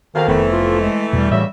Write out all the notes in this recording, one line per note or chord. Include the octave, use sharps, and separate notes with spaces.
F2 B2 D#3 A#3 F5
F1 E3 A3 B3
F4
G#3
E2 B2 G3
D2 A2 C#3 E3 F#4 E5